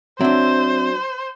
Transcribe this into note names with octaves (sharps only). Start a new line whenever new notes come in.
F#3 C4 D4 C5 E5